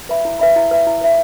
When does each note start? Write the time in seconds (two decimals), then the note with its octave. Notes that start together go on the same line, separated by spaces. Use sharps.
0.09 B4 E5 B5
0.25 E4
0.39 B4 E5 B5
0.56 E4
0.71 B4 E5 B5
0.86 E4
1.01 B4 E5 B5